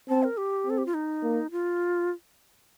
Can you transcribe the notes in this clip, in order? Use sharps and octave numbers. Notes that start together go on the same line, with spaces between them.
C4 A5
A#4
G4
C4 A4
G4
F4
D#4
A#3
F4